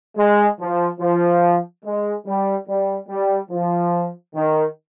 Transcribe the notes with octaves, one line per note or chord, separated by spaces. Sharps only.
G#3
F3
F3
G#3
G3
G3
G3
F3
D#3